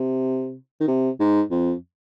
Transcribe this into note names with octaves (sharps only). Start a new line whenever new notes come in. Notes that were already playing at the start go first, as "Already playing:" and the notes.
Already playing: C3
D#3
C3
G#2
F2